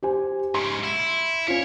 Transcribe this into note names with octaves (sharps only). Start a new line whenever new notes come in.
G4 C5 G#5
G#2 C#3 C6
E4
C#4 F4 C#5